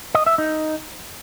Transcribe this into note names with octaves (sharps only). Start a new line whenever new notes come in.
D#5
E5
D#4